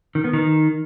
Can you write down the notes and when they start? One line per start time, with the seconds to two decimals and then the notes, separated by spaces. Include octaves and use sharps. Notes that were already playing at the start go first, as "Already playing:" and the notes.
0.15 D#3
0.24 B3
0.33 D#3